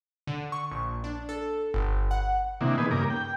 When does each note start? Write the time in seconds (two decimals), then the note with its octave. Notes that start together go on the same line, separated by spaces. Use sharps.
0.27 D3
0.52 C#6
0.71 A#1
1.04 D4
1.29 A4
1.74 G1
2.11 F#5
2.61 C3 D#3 E3 A#3 D4
2.78 D#3 B3 D#4 G#4 B4
2.91 G2 C#3 A#3 A#4 D6
3.10 G5